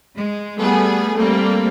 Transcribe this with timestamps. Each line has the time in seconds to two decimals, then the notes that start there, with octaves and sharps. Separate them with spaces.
0.16 G#3
0.60 G3 A3 B3 G#4
1.16 G3 A3 A#3 C4